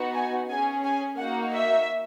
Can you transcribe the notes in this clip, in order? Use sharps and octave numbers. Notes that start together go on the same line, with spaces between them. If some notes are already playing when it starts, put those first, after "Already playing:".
Already playing: B3 D#4 F#4
G#5
C#4 G#4 G#5
G#5
A#3 D#4 F#4 F#5
E5